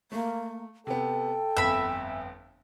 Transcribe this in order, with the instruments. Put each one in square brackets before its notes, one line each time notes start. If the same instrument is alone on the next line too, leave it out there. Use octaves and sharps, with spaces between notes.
[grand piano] A3 [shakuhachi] A#3
[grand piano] C3 B3 [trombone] A4 [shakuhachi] G5
[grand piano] G1 F2 [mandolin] E5 B5